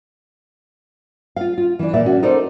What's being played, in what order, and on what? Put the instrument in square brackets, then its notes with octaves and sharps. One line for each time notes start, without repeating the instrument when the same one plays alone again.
[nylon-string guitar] F4 F5
F4
E3 D4
A#2 A#3 D5 E5
C#4 F#4
D#4 A4 A#4 C5 D5